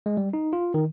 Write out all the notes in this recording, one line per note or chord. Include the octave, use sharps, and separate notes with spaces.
G#3
G3
D#4
F4
D#3